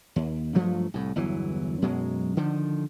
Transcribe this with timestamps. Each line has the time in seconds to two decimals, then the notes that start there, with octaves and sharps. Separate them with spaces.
0.16 D#2
0.55 G2 F3 F#3 A3
0.94 C2 A2
1.16 G1 E2 E3 F#3
1.82 F#2 B2 F#3 G#3
2.37 D3 D#3 F3